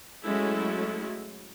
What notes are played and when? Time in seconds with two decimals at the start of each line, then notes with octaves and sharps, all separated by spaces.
0.22 F#3 G#3 A3 C#4 E4 A4